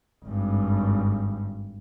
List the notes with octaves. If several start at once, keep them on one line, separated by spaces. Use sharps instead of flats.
G#1 G2